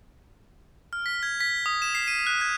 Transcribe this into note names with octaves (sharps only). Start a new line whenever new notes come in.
F6
B6
G#6
B6
D#6
E7
C7
D#7
F#6
G#6